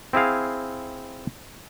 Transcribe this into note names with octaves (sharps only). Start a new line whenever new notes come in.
C4 E4 G#4 F5